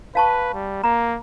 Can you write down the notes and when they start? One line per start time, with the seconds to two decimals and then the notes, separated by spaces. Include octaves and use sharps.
0.15 B4 F5 A5 C#6
0.54 G3
0.84 A#3 A#5